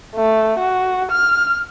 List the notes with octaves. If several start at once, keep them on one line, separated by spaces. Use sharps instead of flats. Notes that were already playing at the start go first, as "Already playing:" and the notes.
A3
F#4
F6